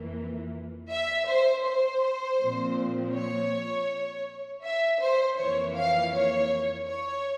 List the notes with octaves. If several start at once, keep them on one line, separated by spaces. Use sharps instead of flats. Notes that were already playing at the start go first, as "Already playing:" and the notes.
Already playing: F2 E3 A#3
E5
C5
C5
A#2 F3 C4
C#5
E5
C5
F2 E3 A#3 C#5
F5
C#5
C#5